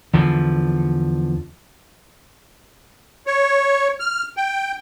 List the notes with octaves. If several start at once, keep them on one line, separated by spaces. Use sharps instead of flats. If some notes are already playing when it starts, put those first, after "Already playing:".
E2 D3 F3
C#5
F6
G5